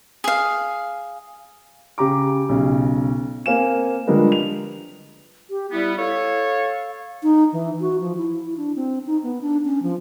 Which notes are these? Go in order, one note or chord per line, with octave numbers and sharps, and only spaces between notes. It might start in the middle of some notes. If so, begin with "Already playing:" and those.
G#4 F5
C#3 G4 A#5 D6
B1 C#3
A#3 C4 F5 G#5 E7
D3 F3 G3 G#3 A#4 B4
F7
G4
G3 B3 E4
A4 C#5 F5
D#4
E3
F#4
F3
E4
D4
C4
D#4
B3
D4
C#4
F3